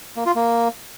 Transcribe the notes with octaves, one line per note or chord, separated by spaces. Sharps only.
A#3
F4
A#3